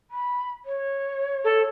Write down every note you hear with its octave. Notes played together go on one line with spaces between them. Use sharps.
B5
C#5
A4